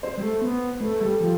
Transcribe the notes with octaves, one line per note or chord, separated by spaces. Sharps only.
C5
G3
A3
B3
A3 B4
G3 A4
F3 G4